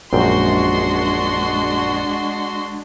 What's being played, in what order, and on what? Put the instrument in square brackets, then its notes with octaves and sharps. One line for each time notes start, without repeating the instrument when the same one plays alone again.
[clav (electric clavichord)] A#1 F#2 G5 [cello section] G#3 D4 [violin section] F#4 C6